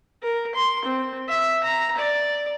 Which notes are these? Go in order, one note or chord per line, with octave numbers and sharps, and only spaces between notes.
A#4
C6
C4
E5
A#5
D5